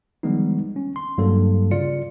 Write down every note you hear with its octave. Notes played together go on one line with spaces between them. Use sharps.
D#3 F3 G3 G#3 B3 D#4
C#4
C6
G2 F#3 G3 A#3 A4
C#3 F4 D5 C#7